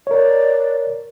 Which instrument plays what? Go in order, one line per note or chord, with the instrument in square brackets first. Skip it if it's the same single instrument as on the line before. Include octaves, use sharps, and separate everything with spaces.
[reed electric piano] A#4 C#5 [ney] D5